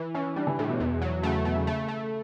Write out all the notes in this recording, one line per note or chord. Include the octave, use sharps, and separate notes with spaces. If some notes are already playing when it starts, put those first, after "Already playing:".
Already playing: E3
E3 C#4
G3 D4
E3
A2 D3
B2
E2
F#3
C#3 A3
B2 A3
C#3
A3
A3